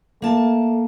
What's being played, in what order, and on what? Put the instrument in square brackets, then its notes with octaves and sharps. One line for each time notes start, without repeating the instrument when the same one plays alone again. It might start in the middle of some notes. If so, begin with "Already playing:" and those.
[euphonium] A3 [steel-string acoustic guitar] A#3 A5